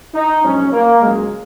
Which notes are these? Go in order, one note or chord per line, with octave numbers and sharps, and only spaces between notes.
D#4
A#1 G#2 F#3 C#4
A#3
C#2 C#3 F#3 G#3